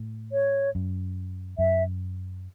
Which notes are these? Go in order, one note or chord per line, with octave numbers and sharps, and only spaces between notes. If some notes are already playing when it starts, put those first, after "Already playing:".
Already playing: A2
C#5
F#2
F#2 E5